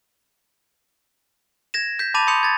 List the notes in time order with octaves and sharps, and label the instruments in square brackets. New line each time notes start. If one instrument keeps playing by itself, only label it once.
[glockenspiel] G#6 A#6 E7
G6 B6
A5 B5 D6 A6 D#7 F7
B5 C6 D#6 G6 C#7 F7
G#6 A6